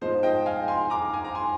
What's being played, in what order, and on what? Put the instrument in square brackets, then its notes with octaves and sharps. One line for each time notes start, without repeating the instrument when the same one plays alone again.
[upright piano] G#2 F3 G#3 D#4 C5
D#5 G5
F5 G#5
G#5 C6
A#5 D6
G#5
A#5
G#5 C6